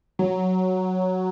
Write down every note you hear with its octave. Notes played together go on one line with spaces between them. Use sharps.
F#3